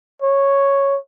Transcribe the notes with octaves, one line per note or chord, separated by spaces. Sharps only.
C#5